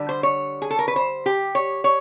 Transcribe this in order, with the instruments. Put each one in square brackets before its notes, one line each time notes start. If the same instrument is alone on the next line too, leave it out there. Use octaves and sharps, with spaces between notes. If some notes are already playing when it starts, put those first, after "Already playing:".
Already playing: [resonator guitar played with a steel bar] D3 G3
C5
C#5
G#4
A4
A#4
B4
C5
G4
C#5
C#5